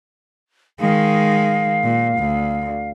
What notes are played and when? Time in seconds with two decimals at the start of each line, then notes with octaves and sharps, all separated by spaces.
0.80 D#3 G#3 F5
1.83 A#2
2.19 D2